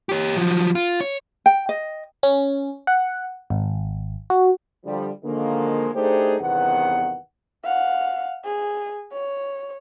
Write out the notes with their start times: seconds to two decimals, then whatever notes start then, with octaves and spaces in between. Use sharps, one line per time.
0.09 G4 C#5
0.36 F3 F#3
0.75 F4
1.01 C#5
1.46 G5
1.69 D#5
2.23 C#4
2.87 F#5
3.50 G#1
4.30 F#4
4.86 D3 F3 G3
5.24 D3 D#3 F3 G#3 A#3
5.95 A3 D4 D#4 G4 G#4 C5
6.40 E2 G2 C3 D#3 B3 F#5
7.65 F5 F#5
8.45 G#4
9.12 C#5